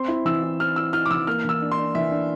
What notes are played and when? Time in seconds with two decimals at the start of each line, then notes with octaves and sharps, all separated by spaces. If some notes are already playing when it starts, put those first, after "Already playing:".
Already playing: C4 C6
0.08 E4
0.25 E3 E6
0.43 E4
0.60 C4 F6
0.76 E4 E6
0.93 E4 F6
1.06 D6
1.11 E3 E6
1.27 A#3 F6
1.44 E3 E6
1.61 D4
1.72 C6
1.78 D4
1.95 E3 E5
2.11 D4